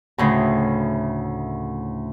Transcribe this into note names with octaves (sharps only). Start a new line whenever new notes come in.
D2 A2 C#3